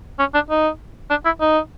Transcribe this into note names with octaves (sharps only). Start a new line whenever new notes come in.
C#4
D4
D#4
D4
E4
D#4